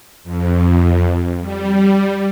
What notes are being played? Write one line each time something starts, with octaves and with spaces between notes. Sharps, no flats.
F2
G3